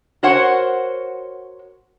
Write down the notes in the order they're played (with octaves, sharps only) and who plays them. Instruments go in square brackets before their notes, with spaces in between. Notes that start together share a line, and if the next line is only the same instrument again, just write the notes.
[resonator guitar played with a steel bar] F#4 A#4 C5 C#5 F#5